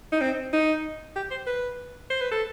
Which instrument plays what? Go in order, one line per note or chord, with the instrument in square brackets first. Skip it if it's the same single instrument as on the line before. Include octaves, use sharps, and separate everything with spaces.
[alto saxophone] D#4
C4
D#4
G4
C5
B4
C5
B4
A4